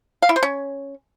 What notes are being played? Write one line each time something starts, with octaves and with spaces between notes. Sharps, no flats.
F5
E4
C5
C#4